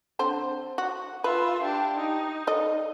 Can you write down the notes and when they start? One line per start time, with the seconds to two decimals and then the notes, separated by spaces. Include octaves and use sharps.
0.19 D3 C4 C5
0.78 F#4
1.24 F4 B4 E5
1.63 D4 G4
1.97 D#4
2.47 A4 D5 D#5